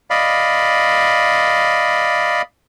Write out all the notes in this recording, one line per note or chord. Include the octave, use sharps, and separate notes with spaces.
D5 D#5 F5 B5